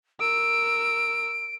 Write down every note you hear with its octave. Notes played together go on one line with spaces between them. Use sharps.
A#4 E6 D7